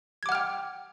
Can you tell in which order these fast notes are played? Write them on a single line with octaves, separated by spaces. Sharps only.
G#6 D6 F#5 F6 G5